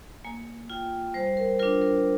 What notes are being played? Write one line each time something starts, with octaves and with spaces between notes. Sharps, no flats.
A#3 G#5
F4 G5
G3 C5
A#4
D4 F4 A#4
A#4